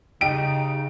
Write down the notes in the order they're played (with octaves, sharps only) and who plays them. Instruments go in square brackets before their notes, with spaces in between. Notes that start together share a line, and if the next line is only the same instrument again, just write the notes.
[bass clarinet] C#3 [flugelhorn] D#4 [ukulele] G4 [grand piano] D7